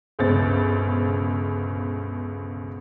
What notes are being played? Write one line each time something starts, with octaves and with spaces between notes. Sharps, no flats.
G1 C#2 B2 C5 A6